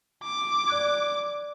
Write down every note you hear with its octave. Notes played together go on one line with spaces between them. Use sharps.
D6
D5 F#6 G#6